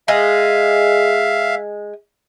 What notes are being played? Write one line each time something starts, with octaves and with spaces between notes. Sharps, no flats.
G#3 E5 F5